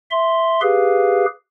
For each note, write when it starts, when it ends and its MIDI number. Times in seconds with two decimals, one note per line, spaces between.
0.11 0.60 76
0.11 0.60 84
0.62 1.26 67
0.62 1.26 68
0.62 1.26 71
0.62 1.26 77